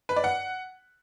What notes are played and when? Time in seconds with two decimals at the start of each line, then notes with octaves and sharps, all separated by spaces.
0.09 B4
0.16 D5
0.24 F#5